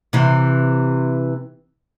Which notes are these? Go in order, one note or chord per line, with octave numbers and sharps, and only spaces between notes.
C3 E3